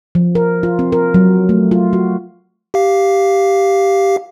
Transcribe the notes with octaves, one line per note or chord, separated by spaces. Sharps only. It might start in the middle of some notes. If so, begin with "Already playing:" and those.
F3
A#4
F4
C4
A#4
F#3
A3
F4
F#4
G4 F5